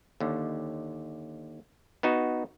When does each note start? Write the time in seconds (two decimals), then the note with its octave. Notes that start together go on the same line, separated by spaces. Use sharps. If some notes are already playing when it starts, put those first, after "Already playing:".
0.20 D#2 D3
2.03 B3 D#4 F#4